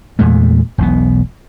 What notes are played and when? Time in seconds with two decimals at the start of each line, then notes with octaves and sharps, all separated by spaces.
0.19 E2 A#2 G#3 A3
0.78 E1 B1 B3